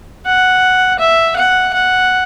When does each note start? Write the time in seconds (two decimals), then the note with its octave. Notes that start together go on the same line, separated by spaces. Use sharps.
0.26 F#5
0.99 E5
1.36 F#5
1.73 F#5